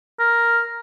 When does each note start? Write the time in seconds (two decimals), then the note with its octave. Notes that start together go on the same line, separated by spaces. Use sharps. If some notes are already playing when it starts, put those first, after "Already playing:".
0.19 A#4